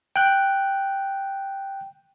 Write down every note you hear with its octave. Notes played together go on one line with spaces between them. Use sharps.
G5 F#6